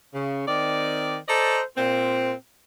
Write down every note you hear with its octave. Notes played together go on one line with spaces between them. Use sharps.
C#3
D#3 C4 D#4 D5
A4 C5 D5 D#5 A#5
A#2 C4